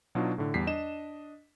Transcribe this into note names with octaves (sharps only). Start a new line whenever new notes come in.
B2 F#3 D4 D#4 F4
A2 D3
E2 G3 B6 C7
D4 D#5 E7